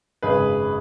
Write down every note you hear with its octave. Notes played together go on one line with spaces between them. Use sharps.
G#1 F#2 C#3 G#3 G#4 B4